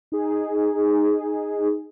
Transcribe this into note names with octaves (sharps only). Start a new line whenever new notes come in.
D#4 G#4